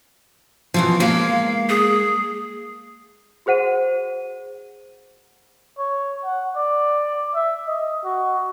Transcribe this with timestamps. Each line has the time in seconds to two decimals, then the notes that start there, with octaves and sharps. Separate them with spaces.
0.74 B2 E3 F3
1.00 G#3 A#3 F5
1.69 G#4
3.46 F#4 G#4 C5 F#5 D#7
5.78 C#5
6.25 F#5
6.56 D5
7.35 E5
7.67 D#5
8.05 F#4